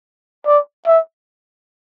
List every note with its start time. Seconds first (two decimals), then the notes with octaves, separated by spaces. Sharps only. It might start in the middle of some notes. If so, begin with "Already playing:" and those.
0.46 D5
0.87 E5